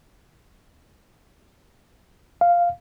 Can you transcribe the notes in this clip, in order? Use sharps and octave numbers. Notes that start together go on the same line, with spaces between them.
F5